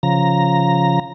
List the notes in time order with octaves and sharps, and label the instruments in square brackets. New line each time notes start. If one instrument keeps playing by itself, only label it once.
[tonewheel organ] C#3 F3 A#5